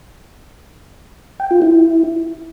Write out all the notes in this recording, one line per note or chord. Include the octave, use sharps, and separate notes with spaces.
G5
F4
E4